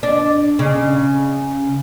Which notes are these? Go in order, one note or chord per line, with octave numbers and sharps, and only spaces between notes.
D4
C#3